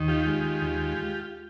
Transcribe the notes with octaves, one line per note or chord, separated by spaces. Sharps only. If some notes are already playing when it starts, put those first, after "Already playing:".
Already playing: D#2 D#3
F4 G4
G#3
D#2